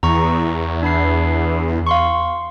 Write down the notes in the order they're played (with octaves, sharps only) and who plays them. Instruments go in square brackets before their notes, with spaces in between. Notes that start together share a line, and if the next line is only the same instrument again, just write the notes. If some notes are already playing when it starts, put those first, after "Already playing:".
[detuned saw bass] E2 [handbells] A#5 C#6
[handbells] D4 B5 C7
F5 C6 C#6